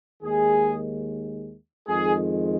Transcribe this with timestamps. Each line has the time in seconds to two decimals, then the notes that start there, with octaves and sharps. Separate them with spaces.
0.23 D#2 D#3 G#3 G#4
1.87 F2 D#3 G#3 G#4